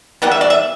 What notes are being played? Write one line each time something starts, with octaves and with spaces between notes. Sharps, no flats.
E3 G3 B3 F#5
E5
D5
E5